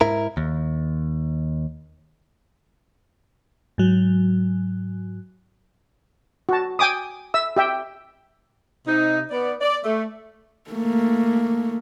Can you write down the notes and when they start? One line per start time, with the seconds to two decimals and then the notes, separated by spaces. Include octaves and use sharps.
0.01 G#2 E4 A#4
0.37 D#2
3.78 G#2 F#3
6.49 F#4 A5
6.79 G5 G#5 D6 D#6
7.34 E5 E6
7.57 G4 E5 G5
8.86 C3 D#4
9.31 B3 D5
9.61 D5
9.84 A3
10.71 A3 A#3